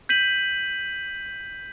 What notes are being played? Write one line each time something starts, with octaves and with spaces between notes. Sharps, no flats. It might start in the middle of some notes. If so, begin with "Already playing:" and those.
G6 B6 D#7 F#7